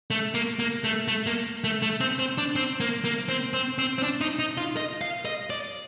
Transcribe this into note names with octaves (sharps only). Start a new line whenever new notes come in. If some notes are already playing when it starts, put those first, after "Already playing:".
A3
A#3
A#3
A3
A3
A#3
A3
A3
C4
C4
D4
C4
A#3
A#3
C4
C4
C4
C4
D4
D#4
D#4
F4
D#5
F5
D#5
D5